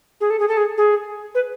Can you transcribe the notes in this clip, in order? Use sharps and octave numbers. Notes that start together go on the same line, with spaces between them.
G#4
A4
G#4
A4
G#4
G#4
B4